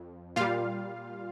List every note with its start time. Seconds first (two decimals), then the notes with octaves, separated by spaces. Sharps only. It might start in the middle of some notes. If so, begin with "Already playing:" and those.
Already playing: F2
0.36 A#2 G3 F4 F5